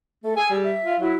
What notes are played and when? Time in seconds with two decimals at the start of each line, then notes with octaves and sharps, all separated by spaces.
0.23 A3 A4
0.36 G#4 G#5 E6
0.50 G3
0.63 E5
0.84 F4
0.99 F#3 E4 F#4